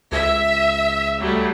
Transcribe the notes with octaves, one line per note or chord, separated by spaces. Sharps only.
C#2 E5
F#3 G3 A3